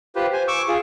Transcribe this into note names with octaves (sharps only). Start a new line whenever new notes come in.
F4 G4 B4 C5
C5 G#5
C#6 D6 E6
F4 G#4